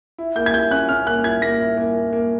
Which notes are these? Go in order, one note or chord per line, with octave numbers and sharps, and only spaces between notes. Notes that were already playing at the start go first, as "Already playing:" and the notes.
E4
A#3 G6
G#6
E4 G6
C#4 F#6
C#4 F6
A#3 F#6
E4 G#6
A#3 A#6
E4
A#3
A#3
A#3